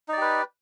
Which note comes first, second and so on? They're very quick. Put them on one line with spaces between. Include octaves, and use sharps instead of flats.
D#4 D5 G4 B4